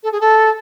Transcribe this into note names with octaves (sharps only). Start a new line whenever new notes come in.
A4
G#4
A4